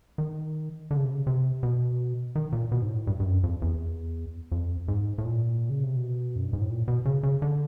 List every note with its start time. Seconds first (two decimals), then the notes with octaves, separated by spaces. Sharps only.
0.18 D#3
0.91 D3
0.97 C#3
1.04 C3
1.11 C#3
1.27 C3
1.63 B2
2.36 D#3
2.52 A#2
2.72 B2
2.82 G#2
2.89 A2
3.07 G2
3.20 G2
3.25 F#2
3.44 F2
3.62 E2
4.52 F2
4.88 G#2
5.18 A2
5.24 A#2
5.70 C#3
5.83 C3
5.97 B2
6.36 F#2
6.44 G2
6.53 G#2
6.62 A2
6.70 A#2
6.88 B2
7.05 C#3
7.23 C#3
7.42 D3